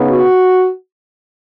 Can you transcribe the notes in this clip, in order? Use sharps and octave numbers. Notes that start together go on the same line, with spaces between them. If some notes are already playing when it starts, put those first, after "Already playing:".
Already playing: C#3 B3 D#4
F#4